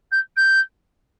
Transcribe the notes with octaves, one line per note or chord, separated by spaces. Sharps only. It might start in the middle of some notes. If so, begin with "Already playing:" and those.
G6
G6